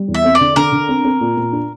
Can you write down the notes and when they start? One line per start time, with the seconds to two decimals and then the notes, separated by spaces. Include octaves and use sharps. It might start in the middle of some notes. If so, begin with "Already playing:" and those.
Already playing: G3
0.08 E2
0.14 E5
0.25 C4
0.35 D5
0.40 D3
0.56 D3 A#4
0.72 D3
0.89 C4
1.04 C4
1.21 A#2
1.37 A#2
1.52 D4